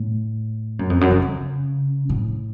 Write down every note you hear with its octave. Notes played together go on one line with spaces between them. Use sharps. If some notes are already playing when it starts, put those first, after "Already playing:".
Already playing: A2
F#2
F2
F#2
C3
C#3
A2